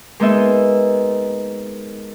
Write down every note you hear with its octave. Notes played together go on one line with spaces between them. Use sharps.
G#3 A#3 B3 D#4 D#5 E5